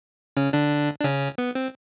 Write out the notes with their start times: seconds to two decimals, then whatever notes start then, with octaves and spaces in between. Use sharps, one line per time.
0.37 C#3 C#4
0.53 D3 D4
1.00 D4
1.04 C#3 C#4
1.38 B3
1.55 C4